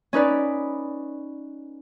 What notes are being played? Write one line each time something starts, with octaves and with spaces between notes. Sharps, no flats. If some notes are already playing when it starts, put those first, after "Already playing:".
C#4 D#4 B4 D5